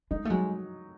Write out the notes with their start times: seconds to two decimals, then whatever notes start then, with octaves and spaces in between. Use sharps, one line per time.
0.11 G#3 D#4
0.25 A3
0.30 F#3 G#3